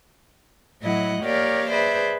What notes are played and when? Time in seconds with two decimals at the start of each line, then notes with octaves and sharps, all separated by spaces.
0.81 A2 F#3 E4 D#5 F#5
1.22 A#3 G4 A#4 C#5 D5 F5
1.70 G#4 B4 C5 D5 E5